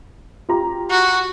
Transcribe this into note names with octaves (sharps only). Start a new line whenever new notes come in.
F4 G4 A#5
F#4